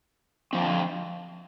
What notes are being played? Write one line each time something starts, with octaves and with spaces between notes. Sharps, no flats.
D3 F3 C4